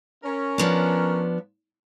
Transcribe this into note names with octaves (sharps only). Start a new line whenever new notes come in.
C#4 A#4
F3 B3 D4